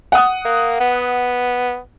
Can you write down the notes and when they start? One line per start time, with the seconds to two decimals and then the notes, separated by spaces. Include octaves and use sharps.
0.12 F#5 D#6
0.45 A#3
0.80 B3